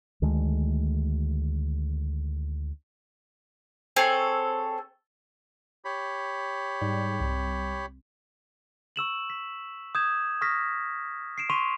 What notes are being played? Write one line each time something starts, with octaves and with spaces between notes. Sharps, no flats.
D2 D#3 G#3 A3
C4 G#4 A4 C#5
G4 C#5 B5
G#2 G3
C2
C#6 E6 E7 F#7
B6
D#6 G6 G#6 E7
C#6 D#6 F6 A#6 B6
C7 D7 E7
C6 C#6 B6 D#7 F7